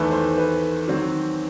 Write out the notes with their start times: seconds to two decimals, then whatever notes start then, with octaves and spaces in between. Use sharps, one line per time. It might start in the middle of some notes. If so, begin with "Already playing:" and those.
Already playing: E2 D#3 A3 E4 B4
0.12 C5
0.38 B4
0.88 D#3 F#3 C4